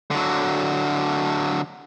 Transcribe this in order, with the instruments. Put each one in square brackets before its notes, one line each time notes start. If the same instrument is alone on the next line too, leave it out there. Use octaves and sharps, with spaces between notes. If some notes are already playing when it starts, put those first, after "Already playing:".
[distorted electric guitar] D3 F#3